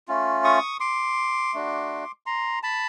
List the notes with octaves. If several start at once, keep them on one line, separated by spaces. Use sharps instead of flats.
A3 C#4 F4
C#6 D#6
C6 D6
A3 D4 F#4
A#5 C6
A5 B5